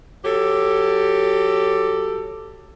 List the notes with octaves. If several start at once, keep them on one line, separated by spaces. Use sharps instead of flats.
F#3 G4 A4